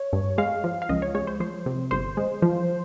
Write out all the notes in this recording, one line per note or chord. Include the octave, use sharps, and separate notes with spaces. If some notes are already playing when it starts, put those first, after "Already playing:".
Already playing: C#5
G2
G#3 F5
F3
F5
C#2 D#5
C#5
G#3 C#5
C5
F3 C5
C3
G1 C5
G#3
F3